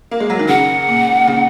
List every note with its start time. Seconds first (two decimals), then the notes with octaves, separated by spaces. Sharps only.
0.11 A#3
0.20 G#3
0.30 F#3
0.39 D#3
0.48 C#3 F#5
0.88 A#2
1.27 C#3